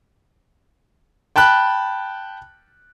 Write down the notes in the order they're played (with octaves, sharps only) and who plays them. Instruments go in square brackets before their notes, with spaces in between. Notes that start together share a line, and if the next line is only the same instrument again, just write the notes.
[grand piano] G5 A5 B5 F#6